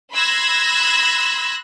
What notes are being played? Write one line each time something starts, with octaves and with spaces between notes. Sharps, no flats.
B5 C6 E6 F#6 G#6 A#6